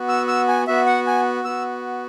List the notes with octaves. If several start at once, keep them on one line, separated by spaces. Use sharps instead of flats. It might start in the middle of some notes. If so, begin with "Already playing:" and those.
Already playing: B3 F#4
E6
E6
G#5
B3 F#4 E5
F#5
G#5
B3 F#4 E6